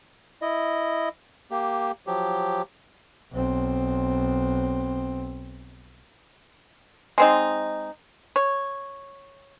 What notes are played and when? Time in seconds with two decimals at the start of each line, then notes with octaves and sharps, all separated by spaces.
0.42 E4 D#5
1.51 A#3 G4
2.07 F3 F#3 G4
3.32 B1 C4
7.18 G#3 C4 D#4
8.36 C#5